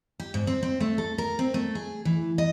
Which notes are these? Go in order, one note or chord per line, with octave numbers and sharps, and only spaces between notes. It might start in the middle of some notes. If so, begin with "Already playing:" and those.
G4
G#2
C4
C4
A3
A4
A#4
C4
A3
G#4
E3
D#5